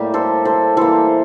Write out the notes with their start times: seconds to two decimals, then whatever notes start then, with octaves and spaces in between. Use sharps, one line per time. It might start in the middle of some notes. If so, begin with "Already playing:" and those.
Already playing: A2 G3 A#3 G4
0.14 A4 C5
0.45 A4 C5
0.77 E3 A#3 A4 C5